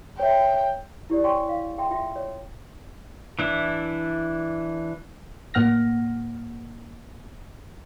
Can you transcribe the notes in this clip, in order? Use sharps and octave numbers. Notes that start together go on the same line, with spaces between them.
C#5 E5 G5
E4 G4 D5
C#5 G5 G#5 C6 C#6
F5
G#4 E5 G5 C6
F4 E5 G5 C6
C#5
E3 D4 E4
A2 A#3 F#5 F6 A#6